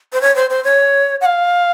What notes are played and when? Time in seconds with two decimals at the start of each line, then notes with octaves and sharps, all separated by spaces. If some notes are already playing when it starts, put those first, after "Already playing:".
0.13 C5
0.21 C#5
0.36 C5
0.50 C5
0.64 C#5
1.21 F#5
1.25 F5